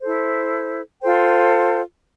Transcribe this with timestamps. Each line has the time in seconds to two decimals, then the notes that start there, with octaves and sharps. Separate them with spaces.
0.01 E4 A4 C5
1.01 F4 A4 C5 G5